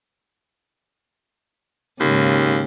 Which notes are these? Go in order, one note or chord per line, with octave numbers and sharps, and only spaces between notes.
D#2 G#2 C#3